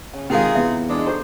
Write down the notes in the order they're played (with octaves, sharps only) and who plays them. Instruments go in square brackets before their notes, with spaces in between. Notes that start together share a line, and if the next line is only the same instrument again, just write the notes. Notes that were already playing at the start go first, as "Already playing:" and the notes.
[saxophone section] C#3 [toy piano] A5
[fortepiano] C3 D#3 G#3 [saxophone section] D#4 F4 G#4 [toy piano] F5 G5
[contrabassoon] E2 [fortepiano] C3 B3 [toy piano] E5
[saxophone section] D#3 E3 G#3 [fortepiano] D4
[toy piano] G4 A4 A#5 [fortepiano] C5